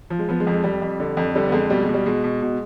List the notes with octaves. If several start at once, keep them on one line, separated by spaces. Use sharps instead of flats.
F3
G#3
F3 B3
G#3
F2
G#3
F2 G3
F2
D3
F2
D3 G3
B3
F2 G#3
B2 G3
G#3
B2
G3
B2 G#3
B2
B2